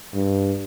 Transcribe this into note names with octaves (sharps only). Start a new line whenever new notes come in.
G2